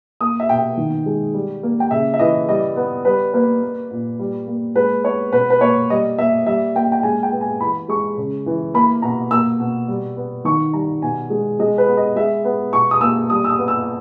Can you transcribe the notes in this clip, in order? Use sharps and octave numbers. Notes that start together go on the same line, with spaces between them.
A#3 D#6
E5
B2 G5
D#3
G#3
G3
A#3
G5
C#3 E5
E5
E3 D#5
G3 D#5
B3
G3 B4
A#3 B4
A#3
A#2
G3
A#3
G#3 B4
B3 C#5
B2 B4
B4
A#3 C#5
G3 D#5
A#3 E5
G3 E5
A#3 G5
G5
G#3 G#5
G5
B3
G#5
E3 B5
G#3 C#6
C#3
E3
A#3 B5
B2 A#5
A#3 E6
B2
G3
B3
D#3 C#6
G3 A#5
B2 G#5
G#3
G#3 D#5
B4
B3
D#5
G#3 E5
B3
B2 C#6
D#6
A#3 E6
G3 D#6
E6
D#6
B3
E6